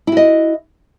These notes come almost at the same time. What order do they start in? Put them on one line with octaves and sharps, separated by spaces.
E4 F#4 D#5